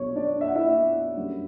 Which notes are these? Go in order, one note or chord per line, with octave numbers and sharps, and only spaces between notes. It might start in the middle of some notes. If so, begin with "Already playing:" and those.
Already playing: B1 B2 G3 D4 C#5
D4 D5
E5
F#5
E4 E5
F#2 D3 G3